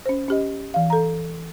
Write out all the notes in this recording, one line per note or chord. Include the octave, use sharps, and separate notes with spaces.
C#4 C5
C#4 G4 D#5
E3 F5
A4 A#5